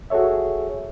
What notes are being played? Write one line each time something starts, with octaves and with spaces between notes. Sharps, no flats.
F#4 G#4 A4 C#5 E5